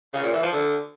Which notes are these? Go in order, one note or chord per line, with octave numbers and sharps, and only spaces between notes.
C#3
A#2
E3
F3
D3